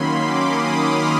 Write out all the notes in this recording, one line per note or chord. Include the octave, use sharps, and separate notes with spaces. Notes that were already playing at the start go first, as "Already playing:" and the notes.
Already playing: D#3 F#3 A#3 C#4 B5 C6
D6
D#6
F6